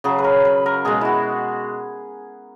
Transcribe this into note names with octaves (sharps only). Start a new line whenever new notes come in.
C#3 F#3 G#4
B4
A#4
B4
A#4
B2 G#3 G#4
E4 F#4